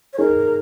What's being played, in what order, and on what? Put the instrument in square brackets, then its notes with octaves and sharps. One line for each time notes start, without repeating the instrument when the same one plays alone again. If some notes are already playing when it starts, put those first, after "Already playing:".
[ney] C#5
[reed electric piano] D#4 G#4 [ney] A#4